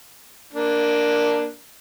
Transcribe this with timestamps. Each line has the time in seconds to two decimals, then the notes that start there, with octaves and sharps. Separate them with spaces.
0.53 A#3 D4